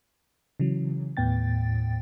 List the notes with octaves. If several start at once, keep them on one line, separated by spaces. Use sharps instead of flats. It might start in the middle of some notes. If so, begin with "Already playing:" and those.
C#3 E3 F#3
D#2 A2 B3 G5 A6